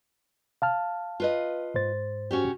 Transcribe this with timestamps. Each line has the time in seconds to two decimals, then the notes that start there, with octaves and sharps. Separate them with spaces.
0.62 F5 A5 F6
1.20 F4 B4 D#5
1.75 G#2 C5 A6
2.31 C#4 F#4 G4